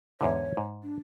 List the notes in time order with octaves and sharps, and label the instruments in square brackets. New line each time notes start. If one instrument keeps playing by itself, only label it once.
[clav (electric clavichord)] E2 G#2 D3 [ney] C#5
[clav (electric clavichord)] G#2
[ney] D4